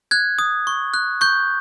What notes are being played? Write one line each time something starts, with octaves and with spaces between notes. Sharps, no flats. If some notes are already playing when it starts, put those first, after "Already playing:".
F#6 G#6
D#6
C#6
F#6
C#6 G6